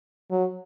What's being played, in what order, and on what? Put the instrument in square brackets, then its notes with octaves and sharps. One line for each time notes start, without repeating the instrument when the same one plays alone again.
[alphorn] F#3